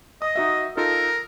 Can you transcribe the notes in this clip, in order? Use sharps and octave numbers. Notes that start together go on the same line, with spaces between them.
D#5 D#6
D#4 F#4 E5
D#4 F4 A4 A#4